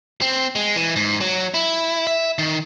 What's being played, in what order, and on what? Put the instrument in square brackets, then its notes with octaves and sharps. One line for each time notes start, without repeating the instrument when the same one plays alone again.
[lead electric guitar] C4
G#3
E3
G#2
F#3
E4
E5
D#3